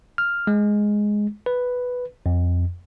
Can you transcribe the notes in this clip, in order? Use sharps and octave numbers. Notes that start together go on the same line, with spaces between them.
F6
G#3
B4
F2